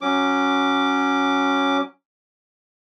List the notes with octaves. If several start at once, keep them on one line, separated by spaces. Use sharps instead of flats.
F#3 C#4 D6